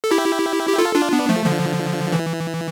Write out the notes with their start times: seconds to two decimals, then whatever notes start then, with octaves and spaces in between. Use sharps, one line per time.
0.04 A4
0.11 E4 G4
0.69 G4
0.78 F4 A4
0.95 D4 F4
1.12 B3 D4
1.29 F3 A3
1.45 D3 F3
2.12 E3